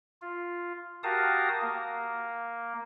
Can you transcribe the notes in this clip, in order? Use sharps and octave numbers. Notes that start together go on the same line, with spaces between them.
F4
F#4 G4 A#4 F5 A5 D#6
A#3